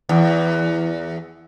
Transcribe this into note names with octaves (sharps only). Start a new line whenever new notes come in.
E2